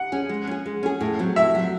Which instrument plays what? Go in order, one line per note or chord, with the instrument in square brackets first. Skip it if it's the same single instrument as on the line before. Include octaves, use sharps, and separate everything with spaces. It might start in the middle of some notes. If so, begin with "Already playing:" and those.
Already playing: [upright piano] F#5
[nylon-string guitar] C#4 G#4
G#3
C#4 G#4
G#3
C#4 G#4
A2
F#3 C4
[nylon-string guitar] A2 [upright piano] E5
[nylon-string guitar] F#3 C4